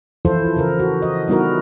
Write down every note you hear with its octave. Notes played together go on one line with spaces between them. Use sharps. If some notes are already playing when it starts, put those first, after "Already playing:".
E3 F3 E4 F4 A4 C5
C#3 A4 A#4
F#4
D#5
G3 B3 D#4 E4 F#4 A#4